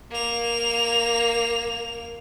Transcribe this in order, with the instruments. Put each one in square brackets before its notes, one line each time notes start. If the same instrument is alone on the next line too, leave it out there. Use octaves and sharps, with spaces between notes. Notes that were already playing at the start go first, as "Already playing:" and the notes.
[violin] A#3 F7